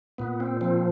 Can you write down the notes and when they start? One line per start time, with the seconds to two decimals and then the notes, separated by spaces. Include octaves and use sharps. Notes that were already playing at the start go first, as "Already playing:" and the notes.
0.18 A#2 B3
0.40 C4
0.61 F3 C4